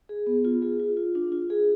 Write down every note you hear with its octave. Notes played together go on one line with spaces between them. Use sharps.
G#4
B3
F4
G#4
F4
F4
D4
F4
G#4